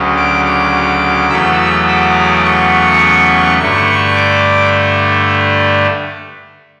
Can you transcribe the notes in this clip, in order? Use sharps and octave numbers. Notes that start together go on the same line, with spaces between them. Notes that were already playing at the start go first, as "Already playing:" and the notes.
Already playing: D2 C#3 F#3
D6
D6
E2 C#3 F#3 A3 E6
E6
D6
C#6
G2 D3 A3 C#6
D6